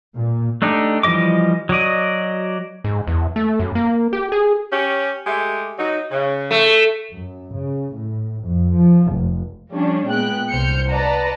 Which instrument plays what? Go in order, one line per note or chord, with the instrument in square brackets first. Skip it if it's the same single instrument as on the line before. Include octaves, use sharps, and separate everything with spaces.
[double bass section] A#2
[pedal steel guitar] A3 D4 D#4 G4
E3 F3 G3 D#5 D6
F#3 F#4 D5 D#5
[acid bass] G#2
E2
A3
F#2
A#3
G4
G#4
[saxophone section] C#4 G4
G#3 A3 G4
F#3 D#4
C#3
[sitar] A3
[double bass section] F#2
C#3
A2
F2
F3
F1
[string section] F3 G3 C#4 D4
A#2 G#3 B3 G5 F#6
C2 C5 F6 G6 C#7
B4 D5 D#5 F#5 A5 A#5